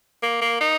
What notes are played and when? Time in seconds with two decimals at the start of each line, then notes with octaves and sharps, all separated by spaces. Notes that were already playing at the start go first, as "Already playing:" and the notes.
0.22 A#3
0.41 A#3
0.61 D#4